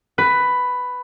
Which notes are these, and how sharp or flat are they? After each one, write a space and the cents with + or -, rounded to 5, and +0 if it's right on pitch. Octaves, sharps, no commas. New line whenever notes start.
B4 +10